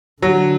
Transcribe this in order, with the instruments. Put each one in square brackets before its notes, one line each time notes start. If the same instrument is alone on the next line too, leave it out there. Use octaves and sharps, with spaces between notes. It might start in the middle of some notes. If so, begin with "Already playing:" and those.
[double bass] D3 [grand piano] F#3